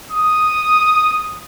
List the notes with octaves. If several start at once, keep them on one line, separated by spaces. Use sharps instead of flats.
D#6